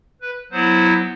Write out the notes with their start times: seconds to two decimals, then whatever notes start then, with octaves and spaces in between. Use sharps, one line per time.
0.22 B4
0.51 F#3 B3 E4 C5